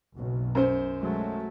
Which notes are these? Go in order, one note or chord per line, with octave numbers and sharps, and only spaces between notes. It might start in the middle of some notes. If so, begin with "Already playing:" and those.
F#1 B1
F#2 C5
F#3 G#3 A3